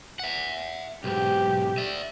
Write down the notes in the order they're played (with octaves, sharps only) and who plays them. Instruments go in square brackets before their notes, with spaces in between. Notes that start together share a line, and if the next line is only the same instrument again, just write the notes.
[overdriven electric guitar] E5 F#5
[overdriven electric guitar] B1 G#2 [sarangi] G4
[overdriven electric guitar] D5 E5